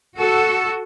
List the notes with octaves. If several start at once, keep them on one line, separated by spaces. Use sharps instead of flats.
F#4 A4